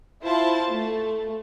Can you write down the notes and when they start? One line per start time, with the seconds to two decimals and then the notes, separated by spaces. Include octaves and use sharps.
0.23 E4 F4 C5 A5
0.71 A3